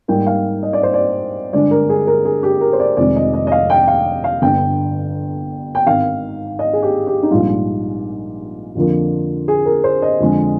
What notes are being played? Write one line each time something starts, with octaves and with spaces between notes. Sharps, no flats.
G#2 G3 A#3 G5
F5
D#5
D5
C5
D5
G2 D3 G#3 D4 D5
A#4
G#4
A#4
G#4
G4
A#4
C5
D5
F1 F2 D#3 G#3 D5
D#5
D#5
D#5
F5
G5
F5
F5
G1 G2 D3 G5
G5
G#1 G#2 D#3 F5
D#5
G#4
G4
G4
D#4
A#1 G#2 G3 F4
F2 D3 F3 A#3
G#4
A#4
C5
D#5
F2 D3 G#3